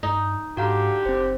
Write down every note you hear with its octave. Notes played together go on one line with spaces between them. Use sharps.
G2 D#4
G#2 D3 F#4 G4 F5 A#5
F#1 C4 C5